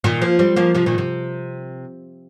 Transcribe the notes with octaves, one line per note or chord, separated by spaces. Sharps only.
A#2 D#3
F3 A#3
G3 C4
F3 A#3
C3 F3
A#2 D#3
C3